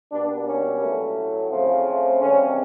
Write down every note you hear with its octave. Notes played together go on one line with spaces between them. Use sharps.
B2 G3 A#3 D4
C#4
A2 F#3 A3
C#3 F3 A3 C4
C#3 E3 G3 C4 C#4